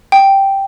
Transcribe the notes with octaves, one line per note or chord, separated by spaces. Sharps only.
G5